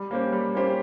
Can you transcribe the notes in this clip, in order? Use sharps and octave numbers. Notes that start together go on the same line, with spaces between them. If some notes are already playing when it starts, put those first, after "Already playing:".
Already playing: G3
A#3 C#4 G4 C5
G3
A#3 C#4 G4 C5